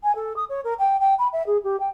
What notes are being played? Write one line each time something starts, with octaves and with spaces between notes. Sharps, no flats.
G#5
A4
D#6
C#5
A#4
G5
G5
B5
E5
G#4
G4
G5